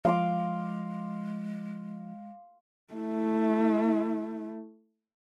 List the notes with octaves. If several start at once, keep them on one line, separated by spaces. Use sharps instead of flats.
F3 G#3 F5 C6 D6
A3 E4